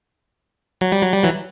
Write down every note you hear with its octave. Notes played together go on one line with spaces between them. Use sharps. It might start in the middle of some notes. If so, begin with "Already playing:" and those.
F#3
G3
F#3
G3
E3 F#3